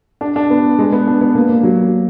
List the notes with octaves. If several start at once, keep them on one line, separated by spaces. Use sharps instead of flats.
D4
D4
B3
G#3
B3
D4
B3
A#3
A#3
F#3